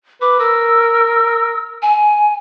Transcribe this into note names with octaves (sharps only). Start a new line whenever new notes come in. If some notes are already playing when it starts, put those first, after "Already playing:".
B4 D6
A#4 E6
G#5